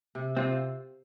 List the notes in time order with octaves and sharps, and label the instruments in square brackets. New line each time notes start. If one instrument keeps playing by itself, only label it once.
[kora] C3
[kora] C3 [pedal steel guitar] C4 F4